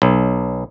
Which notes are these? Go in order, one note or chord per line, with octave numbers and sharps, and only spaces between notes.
B1